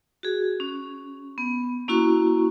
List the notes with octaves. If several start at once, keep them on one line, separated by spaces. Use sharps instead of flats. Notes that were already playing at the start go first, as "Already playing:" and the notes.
F#4 G#4
C#4
B3
A#3 C#4 E4 F#4 C#6